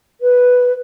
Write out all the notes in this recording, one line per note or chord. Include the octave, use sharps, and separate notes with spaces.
B4